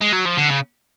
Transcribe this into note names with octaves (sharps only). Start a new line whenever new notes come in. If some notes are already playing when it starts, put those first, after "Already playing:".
G#3
F#3
F3
D3
C#3